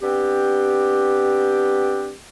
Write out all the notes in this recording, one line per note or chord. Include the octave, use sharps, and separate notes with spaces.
G3 B3 C4 D4 G4